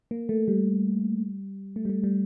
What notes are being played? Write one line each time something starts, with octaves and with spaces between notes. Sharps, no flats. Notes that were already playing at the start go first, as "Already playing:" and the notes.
A#3
A3
G3
A3
G3
A3
G3